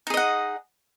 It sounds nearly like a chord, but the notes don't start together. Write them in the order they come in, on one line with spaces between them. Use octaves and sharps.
D#4 G#4 D#5 F#5